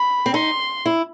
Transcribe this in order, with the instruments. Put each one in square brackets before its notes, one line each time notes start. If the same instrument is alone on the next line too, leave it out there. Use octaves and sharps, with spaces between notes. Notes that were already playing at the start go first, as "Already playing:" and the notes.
Already playing: [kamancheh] B5
[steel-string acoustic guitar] C4
[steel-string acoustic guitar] D#4 [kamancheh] C6
[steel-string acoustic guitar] E4